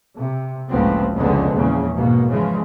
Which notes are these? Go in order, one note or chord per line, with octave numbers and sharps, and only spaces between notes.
C3
F#1 C#2 A2 F3 B3 C4
F1 C#2 D3 G#3 B3 C4
A#1 E2 C#3
G#1 B2 A#3
C#3 E3 F3 G#3